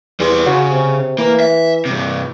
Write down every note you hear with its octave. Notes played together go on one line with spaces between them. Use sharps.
E2 G3 C6
C#3 F#4
C3
E3 A#3
E5
G2 C3